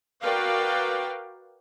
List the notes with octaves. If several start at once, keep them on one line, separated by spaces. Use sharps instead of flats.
F#4 A#4 B4 D5 F5 G5